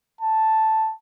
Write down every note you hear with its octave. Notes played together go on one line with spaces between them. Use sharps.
A5